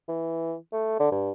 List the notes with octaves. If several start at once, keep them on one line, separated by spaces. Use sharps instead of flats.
E3
A3
D3
G2